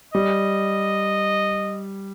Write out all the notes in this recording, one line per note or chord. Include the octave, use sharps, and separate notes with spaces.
G3 D#5